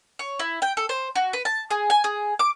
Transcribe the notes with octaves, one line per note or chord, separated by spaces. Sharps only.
C#5
E4
G5
A4
C5
F#4
B4
A5
G#4
G#5
G#4
D6